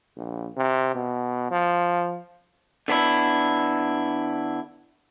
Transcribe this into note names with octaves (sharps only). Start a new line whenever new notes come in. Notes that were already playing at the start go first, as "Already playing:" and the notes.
A#1
C3
B2
F3
D3 B3 D4 E4